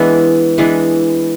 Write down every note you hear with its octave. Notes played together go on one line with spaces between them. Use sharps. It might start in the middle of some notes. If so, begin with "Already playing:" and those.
Already playing: E3 G#3 B3 D4
E3 G#3 B3 D4